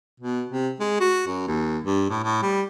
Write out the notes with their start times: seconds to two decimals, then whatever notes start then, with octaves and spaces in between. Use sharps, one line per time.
0.20 B2
0.49 C3
0.80 G#3
1.00 F#4
1.27 F#2
1.47 D#2
1.84 G2
2.10 A2
2.24 A2
2.42 G3